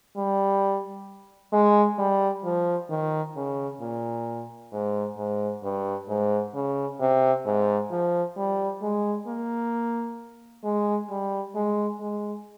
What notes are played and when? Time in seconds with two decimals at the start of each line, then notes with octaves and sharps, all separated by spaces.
0.17 G3
1.53 G#3
1.99 G3
2.44 F3
2.90 D#3
3.36 C#3
3.81 A#2
4.72 G#2
5.18 G#2
5.63 G2
6.09 G#2
6.54 C#3
7.00 C3
7.46 G#2
7.91 F3
8.37 G3
8.82 G#3
9.27 A#3
10.64 G#3
11.10 G3
11.55 G#3
12.00 G#3